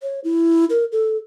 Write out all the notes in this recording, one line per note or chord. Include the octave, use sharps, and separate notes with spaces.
C#5
E4
A#4
A4